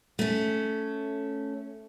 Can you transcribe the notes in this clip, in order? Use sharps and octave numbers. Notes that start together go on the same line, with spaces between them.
A3 C#4